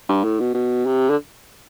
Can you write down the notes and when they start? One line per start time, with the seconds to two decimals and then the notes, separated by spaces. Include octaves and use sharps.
0.09 G2
0.24 A2
0.40 B2
0.54 B2
0.86 C3
1.10 D3